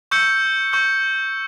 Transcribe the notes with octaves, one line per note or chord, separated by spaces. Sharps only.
C#6 E6 G6 C#7
C#6 E6 G6